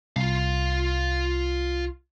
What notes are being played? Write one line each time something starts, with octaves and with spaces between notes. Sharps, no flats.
C2 F4 F5